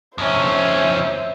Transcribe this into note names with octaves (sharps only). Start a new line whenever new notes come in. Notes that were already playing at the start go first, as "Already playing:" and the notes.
F2 C#4 C5 E5